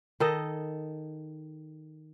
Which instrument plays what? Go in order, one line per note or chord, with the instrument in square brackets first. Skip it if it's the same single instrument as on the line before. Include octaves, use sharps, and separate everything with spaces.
[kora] D#3 A4 D#5